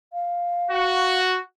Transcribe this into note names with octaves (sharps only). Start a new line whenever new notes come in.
F5
F#4